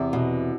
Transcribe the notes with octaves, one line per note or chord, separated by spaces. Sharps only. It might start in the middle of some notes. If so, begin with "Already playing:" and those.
Already playing: E2 C3
B2